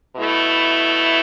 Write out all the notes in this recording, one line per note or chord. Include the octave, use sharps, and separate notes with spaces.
B2 A3 E4